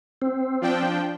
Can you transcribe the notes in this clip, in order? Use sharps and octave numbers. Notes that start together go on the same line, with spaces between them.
C4
F3 D4 G5